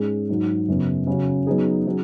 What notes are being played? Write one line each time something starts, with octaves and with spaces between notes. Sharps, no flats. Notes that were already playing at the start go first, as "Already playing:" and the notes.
Already playing: G#2 G#3 C#4 G#4
G#2 F#3 D#4
F#2 C#3 F#3 B3
C#3 F#3 C#4 F#4
F#3 B3 D#4 G#4
F#3 C#4 G#4